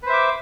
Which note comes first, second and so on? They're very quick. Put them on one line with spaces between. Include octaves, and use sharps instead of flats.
B4 C5 E5 D6